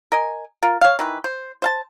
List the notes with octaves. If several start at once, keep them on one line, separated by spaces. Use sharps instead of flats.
A#4 D#5 G#5
F4 A#4
C#5 F5
D#3 E3 B4
C5
C5 F5 A5